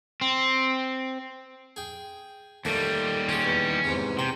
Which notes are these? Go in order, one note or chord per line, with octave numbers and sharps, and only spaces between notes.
C4
G#4 G5
D#2 G3 A3 A#3 A4
C#4 F4 G#4
E2
E2 G#2 C3
C3 G5